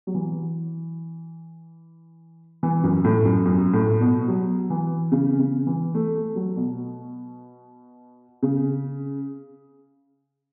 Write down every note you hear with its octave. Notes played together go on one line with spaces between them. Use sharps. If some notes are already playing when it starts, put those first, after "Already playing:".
F#3
E3
E3
F#2
A2
F#2
F#2
A2
B2
F#3
E3
C#3
C#3
E3
A3
A3
F#3
B2
C#3